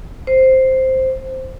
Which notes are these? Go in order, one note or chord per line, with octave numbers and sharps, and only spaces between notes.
C5